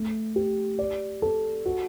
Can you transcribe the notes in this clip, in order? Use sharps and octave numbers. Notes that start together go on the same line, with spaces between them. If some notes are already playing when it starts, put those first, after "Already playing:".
Already playing: A3
G4
D5
A4
F#4